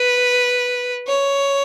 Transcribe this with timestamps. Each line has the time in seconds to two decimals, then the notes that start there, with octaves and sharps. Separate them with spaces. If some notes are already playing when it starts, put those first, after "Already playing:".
Already playing: B4
1.08 C#5